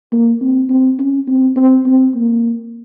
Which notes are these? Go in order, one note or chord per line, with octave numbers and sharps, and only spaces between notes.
A#3
C4
C4
C#4
C4
C4
C4
A#3